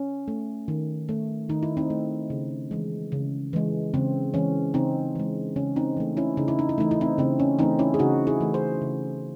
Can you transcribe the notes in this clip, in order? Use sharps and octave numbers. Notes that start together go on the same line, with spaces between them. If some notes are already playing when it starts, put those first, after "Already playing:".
Already playing: C#4
A3
D#3
A3
D#3 D#4
E4
C4 D#4
A3
C#3
E3 G#3
C#3
E3 G#3
C#3 C4
E3 G#3 C#4
C#3 C4 D#4
E3 G#3
C#3 C#4
C4 D#4
E3 A3
C#4 E4
C#3 D#4
E4
D#4
E4
E3 A3 D#4
E4
C4 D#4
C#3 C4
C#4
E3 A3 C4 D#4
C#4 E4
G#4
C#3 D#4 F#4
E4 G#4
E3 A3
G#4 C5
C#3